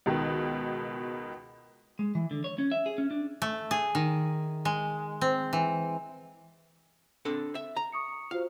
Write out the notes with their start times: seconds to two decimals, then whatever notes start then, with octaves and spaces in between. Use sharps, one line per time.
0.06 C#2 B2 D#3
1.99 G#3
2.15 E3
2.31 D3
2.44 C#5
2.58 C#4
2.71 E5
2.86 G#4
2.98 C#4
3.11 D4
3.42 A3
3.71 G#4
3.95 D#3
4.65 G#3
5.21 C4
5.53 E3
7.25 C4 D4 A4
7.55 E5
7.76 A#5
7.92 C#6 D#6 C#7
8.31 F4 F#4 C5 F5